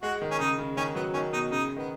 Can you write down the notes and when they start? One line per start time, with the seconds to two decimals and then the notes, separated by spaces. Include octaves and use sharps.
0.02 G#3 F#4
0.22 D#3
0.31 C#4
0.39 C#3 D#4
0.59 C#3
0.77 D#3 C#4
0.95 F#3 B3
1.14 D#3 C#4
1.33 B2 D#4
1.51 C#3 D#4
1.76 D#3 B3